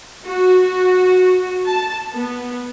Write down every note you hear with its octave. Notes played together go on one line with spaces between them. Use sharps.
F#4
A5
B3